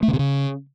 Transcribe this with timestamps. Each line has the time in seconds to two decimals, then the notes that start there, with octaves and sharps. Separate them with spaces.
0.03 A3
0.08 C#3
0.14 C3
0.19 C#3